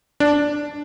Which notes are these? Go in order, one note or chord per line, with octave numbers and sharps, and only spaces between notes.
D4